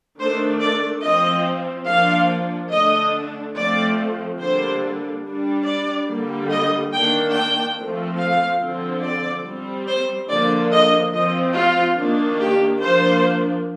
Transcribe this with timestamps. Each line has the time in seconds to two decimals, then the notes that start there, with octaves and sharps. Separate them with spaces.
0.20 D#3 A3 D4 C5
0.61 D5
1.03 F3 C4 D#5
1.87 F3 A#3 D4 F5
2.71 D3 A3 D4 D#5
3.56 F3 A3 C4 D5
4.39 D3 G3 A#3 D4 C5
5.25 G3 D4
5.65 D5
6.08 D3 G3 A#3
6.50 D#5
6.92 D#3 A#3 D4 G5
7.34 G5
7.76 F3 A3 C4
8.18 F5
8.60 D3 F3 C4
9.03 D5
9.45 G3 C4
9.87 C5
10.29 D3 F3 A#3 D4 D5
10.72 D#5
11.13 F3 C4 D#5
11.55 F4
11.97 D#3 A#3 D4
12.40 G4
12.81 F3 A#3 D4 C5